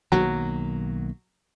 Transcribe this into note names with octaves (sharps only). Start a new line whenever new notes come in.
B1 D#3 F#3 A#3